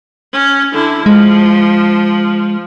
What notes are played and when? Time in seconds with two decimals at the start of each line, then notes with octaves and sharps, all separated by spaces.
0.33 C#4
0.73 D3 E4
1.06 F3 G#3